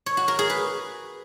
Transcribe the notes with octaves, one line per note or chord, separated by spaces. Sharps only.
C#5
F#4
A#4
G#4
B4